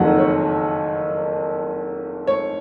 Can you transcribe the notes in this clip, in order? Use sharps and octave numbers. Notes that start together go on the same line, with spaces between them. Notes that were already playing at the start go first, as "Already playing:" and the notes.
Already playing: F#1 F2 D#3 F#3 F#5
C#5
C#5